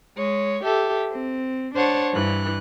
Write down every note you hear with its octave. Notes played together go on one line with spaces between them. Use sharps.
G#3 C#5
G4 A4 E5
C4
D4 C5 C#5 F#5 A5
G2 E3 F#6